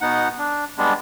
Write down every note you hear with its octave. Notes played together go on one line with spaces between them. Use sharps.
B2 B3 D#4 F#5
D4
G3 G#3 B3 D4